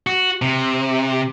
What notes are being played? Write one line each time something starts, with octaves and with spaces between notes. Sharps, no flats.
F#4
C3